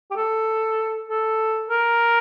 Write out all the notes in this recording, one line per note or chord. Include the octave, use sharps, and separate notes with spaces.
G4
A4
A4
A#4